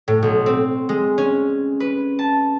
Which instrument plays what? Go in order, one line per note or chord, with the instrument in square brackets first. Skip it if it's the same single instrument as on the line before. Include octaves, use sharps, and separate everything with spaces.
[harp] A2
B1
C4
G#3
C#4
B4
A5